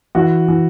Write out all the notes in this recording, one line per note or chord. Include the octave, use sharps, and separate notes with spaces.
E3 F#4
E3